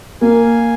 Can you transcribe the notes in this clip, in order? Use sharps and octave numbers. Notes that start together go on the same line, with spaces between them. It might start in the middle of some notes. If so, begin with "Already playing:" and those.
A#3 F5 G#5